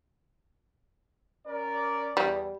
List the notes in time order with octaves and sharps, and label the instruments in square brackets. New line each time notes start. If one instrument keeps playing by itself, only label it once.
[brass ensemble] C#4 A#4 D5
[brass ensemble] E2 [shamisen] G3